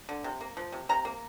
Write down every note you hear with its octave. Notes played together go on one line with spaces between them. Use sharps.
D3
C3
A#3
F3
C3
C3 A#5
A#3